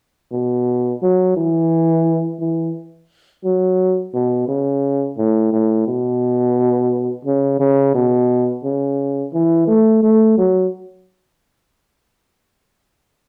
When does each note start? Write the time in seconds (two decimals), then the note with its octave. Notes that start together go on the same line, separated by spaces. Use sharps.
0.32 B2
1.02 F#3
1.37 E3
2.40 E3
3.44 F#3
4.14 B2
4.48 C#3
5.18 A2
5.53 A2
5.87 B2
7.25 C#3
7.59 C#3
7.95 B2
8.64 C#3
9.33 E3
9.67 A3
10.03 A3
10.38 F#3